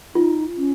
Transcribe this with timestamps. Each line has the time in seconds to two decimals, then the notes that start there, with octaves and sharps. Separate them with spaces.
0.15 D#4 F4
0.58 C#4